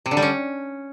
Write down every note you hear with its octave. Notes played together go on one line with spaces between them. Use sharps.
C3
D3
G3
C#4